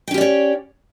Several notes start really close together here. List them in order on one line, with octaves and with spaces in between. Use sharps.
G5 C#4 G4 D5 C#5